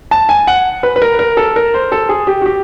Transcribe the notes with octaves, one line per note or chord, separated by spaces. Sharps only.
A5
G#5
F#5
B4
B4
A#4
A#4
A4
A#4
C5
A4
G#4
G4
F#4
G4